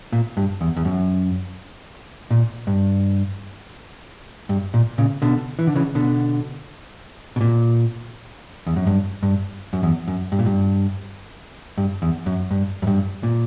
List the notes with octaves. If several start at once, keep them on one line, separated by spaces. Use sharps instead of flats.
A#2
G2
E2
E2
F#2
A#2
G2
G2
A#2
A#2 C#3
B2 D3
E3
D3
C#3 E3
B2 D3
B2
A#2
E2
F#2
G2
G2
F#2
E2
F#2
G2
A#2
G2
G2
E2
F#2
G2
F#2
G2
A#2